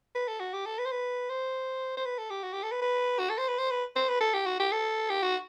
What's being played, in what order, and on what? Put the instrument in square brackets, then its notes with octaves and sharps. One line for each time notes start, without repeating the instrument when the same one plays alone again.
[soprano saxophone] B4
A4
F#4
G4
A4
B4
C5
B4
C5
C5
B4
A4
G4
F#4
G4
A4
B4
B4
F#4
A4
C5
B4
C5
B4
C5
B4
A4
G4
F#4
G4
A4
G4
F#4